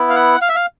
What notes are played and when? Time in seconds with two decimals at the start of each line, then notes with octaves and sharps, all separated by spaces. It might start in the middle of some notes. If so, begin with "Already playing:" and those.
Already playing: B3 E4
0.10 F5
0.15 F#5
0.42 F5
0.49 E5
0.55 F5